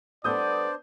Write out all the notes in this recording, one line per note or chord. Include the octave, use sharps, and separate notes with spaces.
G3 B3 D4 A4 C5 D5 D#6 G6